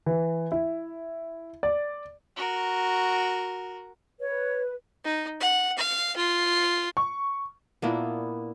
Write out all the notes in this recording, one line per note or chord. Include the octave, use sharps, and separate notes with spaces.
E3
E4
D5
F#4 A#4
B4 C#5
D#4
F#5
F5
F4
C#6
A#2 A#3 B3 D4 E4